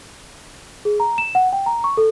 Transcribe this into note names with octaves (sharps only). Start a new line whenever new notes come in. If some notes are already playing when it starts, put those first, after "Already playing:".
G#4
A#5
E7
F#5
G5
A#5
C#6
A4